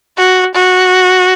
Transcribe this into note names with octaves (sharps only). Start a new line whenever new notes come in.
F#4
F#4